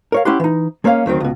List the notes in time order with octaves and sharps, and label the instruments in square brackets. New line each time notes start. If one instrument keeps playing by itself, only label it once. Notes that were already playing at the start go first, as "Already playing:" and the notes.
[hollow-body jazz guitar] A#4 C#5 F5
C#4 E4 G4 F#5 C6
E3 D#4
G#3 A#3 C#4 C#5 F5
D2 D#3 F#3 C4
C#2 B2